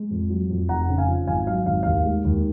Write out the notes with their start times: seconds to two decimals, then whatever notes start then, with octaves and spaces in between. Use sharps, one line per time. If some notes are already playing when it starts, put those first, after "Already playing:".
Already playing: G#3
0.11 F2
0.30 F#3
0.50 F2
0.69 F1 F#5 A#5
0.89 C#3
0.98 F5 G#5
1.08 F3
1.27 G#1 F5 G#5
1.47 F#3 F5
1.66 G#1 F5
1.83 D#2 F5
2.05 G#3
2.24 D#2